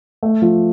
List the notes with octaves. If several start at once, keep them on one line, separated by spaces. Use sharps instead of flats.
A3
F3